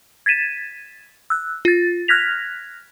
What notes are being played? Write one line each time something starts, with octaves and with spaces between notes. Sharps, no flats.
G#6 A6 B6 D#7 E7
E6 F#6
F4 A6
F6 F#6 G#6 A#6 B6 F7